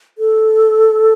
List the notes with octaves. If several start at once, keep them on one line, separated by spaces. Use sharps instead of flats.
A4